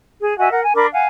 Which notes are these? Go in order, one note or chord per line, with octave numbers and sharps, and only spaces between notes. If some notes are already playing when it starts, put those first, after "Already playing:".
G#4
F#4 D#5 E5 G#5
A#4 F#5
G#5
D4 A#4 B5 D6
F5 F#5 G#5